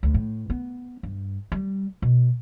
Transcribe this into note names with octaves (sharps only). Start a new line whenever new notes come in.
D2
A2
B3
G2
G3
B2